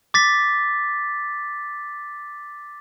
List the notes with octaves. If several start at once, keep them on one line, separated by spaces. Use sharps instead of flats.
D6 A6 B6